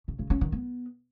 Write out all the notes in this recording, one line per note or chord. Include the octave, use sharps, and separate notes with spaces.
C#3
C#3
C#4
D#3
B3